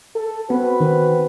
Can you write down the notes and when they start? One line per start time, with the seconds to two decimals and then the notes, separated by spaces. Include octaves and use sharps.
0.16 A4
0.50 B3 C4 F#4 B4
0.80 D#3